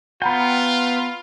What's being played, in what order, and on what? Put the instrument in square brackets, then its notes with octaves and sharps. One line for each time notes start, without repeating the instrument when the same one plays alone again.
[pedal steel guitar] B3 G5 [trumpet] F4 [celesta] F#5 A#5 B5